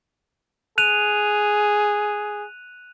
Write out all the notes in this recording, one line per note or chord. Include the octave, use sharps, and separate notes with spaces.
G#4 F#6 D#7 F7